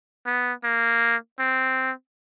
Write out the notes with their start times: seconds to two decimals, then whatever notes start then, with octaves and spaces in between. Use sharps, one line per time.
0.26 B3
0.64 A#3
1.39 C4